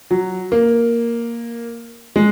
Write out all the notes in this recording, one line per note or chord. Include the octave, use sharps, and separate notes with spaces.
F#3
A#3
G#3